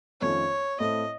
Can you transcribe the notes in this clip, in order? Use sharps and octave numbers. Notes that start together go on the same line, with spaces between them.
F2 D#3 A3 C#4 F4 C#5
A2 A3 C4 D#5